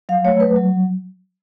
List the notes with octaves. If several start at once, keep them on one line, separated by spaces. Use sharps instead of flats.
F#3 F5
A3 C#5
F#3 B4
F#3